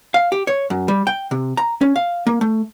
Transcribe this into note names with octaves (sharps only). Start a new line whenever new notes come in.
F5
G4
C#5
F#2
G3
G5
C3
A#5
C#4
F5
A#3
A3